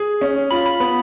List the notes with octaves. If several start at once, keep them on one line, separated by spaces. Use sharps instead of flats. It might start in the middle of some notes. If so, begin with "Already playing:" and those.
Already playing: G#4
C#4
F4 B5
B5
B3 B5